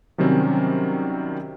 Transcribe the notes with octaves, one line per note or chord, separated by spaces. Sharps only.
C3 D#3 F#3 G3 C4 C#4